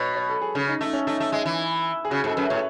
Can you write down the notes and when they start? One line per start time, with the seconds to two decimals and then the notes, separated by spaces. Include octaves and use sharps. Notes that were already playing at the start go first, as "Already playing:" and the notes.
Already playing: B2 B4 C#5
0.16 C#5
0.29 A4
0.42 G#4
0.55 C#3 C#4
0.68 D#4
0.81 A3 D#4
0.93 C#4
1.07 A3 D#4
1.20 A3
1.32 G#3
1.46 E3
2.05 G#4
2.10 C#3 F#4
2.24 G#2 A4
2.37 F#2 B4
2.50 A2 C#5